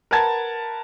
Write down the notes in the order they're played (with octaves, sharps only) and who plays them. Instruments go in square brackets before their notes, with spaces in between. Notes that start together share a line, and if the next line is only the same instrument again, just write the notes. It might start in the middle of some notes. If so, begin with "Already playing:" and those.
[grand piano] A#4 B4 F#5 A5 G#6 A6